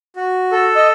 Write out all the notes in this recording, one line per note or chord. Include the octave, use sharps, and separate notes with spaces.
F#4
A4
D#5